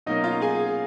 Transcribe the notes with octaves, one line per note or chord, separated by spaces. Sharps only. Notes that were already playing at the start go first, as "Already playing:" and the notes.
B2 F#3 A#3 C#4 D#4 D#5
F4 F5
G#4 G#5